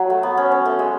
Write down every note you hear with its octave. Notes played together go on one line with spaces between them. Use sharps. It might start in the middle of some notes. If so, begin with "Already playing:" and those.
Already playing: F#3
A3
B3
C#4
C#4
A3
G#3